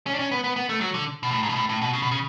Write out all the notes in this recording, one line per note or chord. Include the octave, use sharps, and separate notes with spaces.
C#4
D4
C#4
B3
B3
B3
A3
F#3
D3
B2
A2
G#2
B2
A2
A2
B2
C#3
B2
C#3